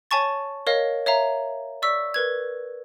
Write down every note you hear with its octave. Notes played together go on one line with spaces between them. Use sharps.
C#5 G#5 A5 C#6 A6
A#4 C#5 D#5 F5
C#5 E5 F5 A#5
D5 C#6 E6 B6
A#4 B4 G#6